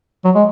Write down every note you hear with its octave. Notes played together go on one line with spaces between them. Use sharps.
F#3
G#3